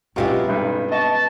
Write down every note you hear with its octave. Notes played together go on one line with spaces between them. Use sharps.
B2 F#3 G#3 C4 C#4 E4 F4 G4
B1 G2
D#5 A5 C#6